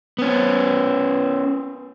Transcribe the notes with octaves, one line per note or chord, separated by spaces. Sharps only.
B3 C#4